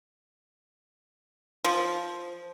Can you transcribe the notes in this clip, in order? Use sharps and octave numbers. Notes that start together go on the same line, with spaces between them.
F3